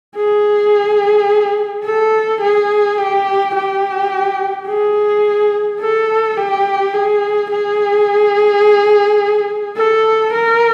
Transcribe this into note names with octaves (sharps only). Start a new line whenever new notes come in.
G#4
A4
G#4
G4
G4
G#4
A4
G4
G#4
G#4
A4
A#4